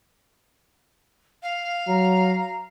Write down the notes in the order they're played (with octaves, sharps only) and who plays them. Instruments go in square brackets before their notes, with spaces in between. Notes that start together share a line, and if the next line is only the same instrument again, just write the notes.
[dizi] F5
[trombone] F#3 [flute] A#5